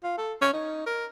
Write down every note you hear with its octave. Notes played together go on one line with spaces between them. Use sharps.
F4
A4
C#4
D#4
A#4